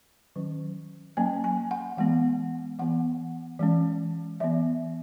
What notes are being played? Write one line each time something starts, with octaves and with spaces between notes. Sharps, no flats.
D#3 F#3 C#4
F#3 A#3 C#4 G#5
G#5
F#5
E3 G#3 B3 F#5
E3 B3 F#5
E3 G#3 C#4
E3 B3 E5